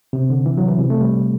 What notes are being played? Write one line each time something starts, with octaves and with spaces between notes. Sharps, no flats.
C3
D3
E3
F#3
E3
C3
A3
G3